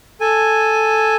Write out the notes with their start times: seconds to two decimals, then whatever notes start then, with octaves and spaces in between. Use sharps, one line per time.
0.21 A4 G#5